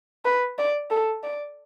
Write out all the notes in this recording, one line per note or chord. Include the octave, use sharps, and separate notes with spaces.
B4
D5
A4
D5